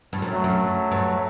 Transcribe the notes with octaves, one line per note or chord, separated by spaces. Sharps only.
G2
F#2
F#3 A3
F#2
G2